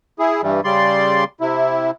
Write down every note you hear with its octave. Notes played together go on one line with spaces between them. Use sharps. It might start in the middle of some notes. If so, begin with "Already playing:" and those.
E4 G#4
G2 E3 G3
C#3 G3 D5 C6
C3 E4